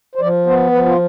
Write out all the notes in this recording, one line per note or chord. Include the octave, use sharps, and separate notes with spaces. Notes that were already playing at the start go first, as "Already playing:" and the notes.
C5
F3 D5
B3 C5
F3 B4
F4